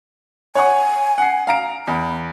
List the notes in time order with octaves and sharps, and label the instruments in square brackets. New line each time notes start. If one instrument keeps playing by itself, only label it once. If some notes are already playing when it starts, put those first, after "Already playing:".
[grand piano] C#5 F#5 C#6 [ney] G#5
[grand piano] F#5 C7
F5 A#5 D7
[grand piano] E2 [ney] B5